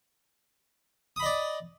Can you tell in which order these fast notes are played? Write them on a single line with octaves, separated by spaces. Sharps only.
D#6 B5 D#5 D5